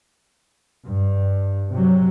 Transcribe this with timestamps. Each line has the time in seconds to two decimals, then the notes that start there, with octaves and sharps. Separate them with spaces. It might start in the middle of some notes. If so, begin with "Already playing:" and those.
0.85 G2
1.71 C3 F#3